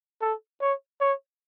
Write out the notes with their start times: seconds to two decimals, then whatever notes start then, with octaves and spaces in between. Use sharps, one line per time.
0.21 A4
0.61 C#5
1.01 C#5